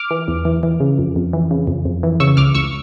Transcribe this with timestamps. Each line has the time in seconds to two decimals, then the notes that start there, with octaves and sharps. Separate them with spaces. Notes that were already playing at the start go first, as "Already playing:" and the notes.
Already playing: D6 F6
0.11 E3
0.28 E2
0.45 E3
0.63 E3
0.80 C#3
0.99 F2
1.16 F2
1.33 E3
1.51 C#3
1.67 F2
1.85 F2
2.03 E3
2.20 C#3 C#6 E6
2.37 C#2 D6 F6
2.55 C#2 C#6 E6